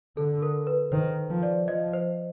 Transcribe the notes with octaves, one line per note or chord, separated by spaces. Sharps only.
D3 A4
A#4
B4
D#3 C5
F3
D5
F3 D#5
C5